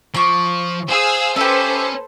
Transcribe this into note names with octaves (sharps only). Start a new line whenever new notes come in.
F3 C#6 D6
G#4 C5 F5 E6
C#4 G4 A4 B4 C5 E5